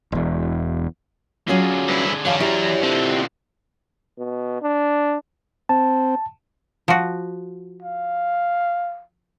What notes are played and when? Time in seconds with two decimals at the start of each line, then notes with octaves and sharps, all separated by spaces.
0.12 E1 E2
1.48 D3 F#3 C#4 F4 G#4
1.88 G2 E4
2.25 E3 F#3 C#4 F5 A5
2.40 E2 E4 G4 D5 A#5
2.83 D3 F3 C4
4.18 B2
4.62 D4
5.69 C4 A5
6.88 F3 F#4
7.82 F5